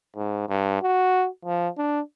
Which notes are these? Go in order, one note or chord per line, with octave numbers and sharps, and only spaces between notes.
G#2
G2
F#4
F3
D4